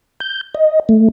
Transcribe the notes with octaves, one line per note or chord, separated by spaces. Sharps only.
G6
D#5
A3